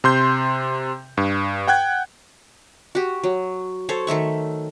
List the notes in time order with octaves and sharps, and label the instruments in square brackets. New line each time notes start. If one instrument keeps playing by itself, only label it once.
[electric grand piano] C3 C6 G6
G2
F#5 G5 F#6 G#6
[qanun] F#4 G4
F#3
A4 C5 C#5
D#3 A3 E5 C#6